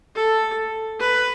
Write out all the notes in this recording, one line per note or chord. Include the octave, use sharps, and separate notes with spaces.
A4
B4